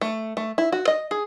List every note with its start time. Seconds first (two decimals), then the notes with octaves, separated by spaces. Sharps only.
0.01 A3
0.37 A3
0.58 E4
0.72 F#4
0.88 D#5
1.11 G#4